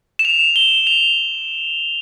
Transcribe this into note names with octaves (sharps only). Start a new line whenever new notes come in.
E7
F7
G7
F7